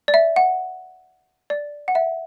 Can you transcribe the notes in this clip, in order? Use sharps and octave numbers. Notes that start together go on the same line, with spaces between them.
D5
E5
F#5
D5
F#5
E5